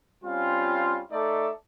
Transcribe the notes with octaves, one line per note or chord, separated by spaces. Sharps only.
G3 C4 C#4 F4
A3 D#4 A4 D5 E5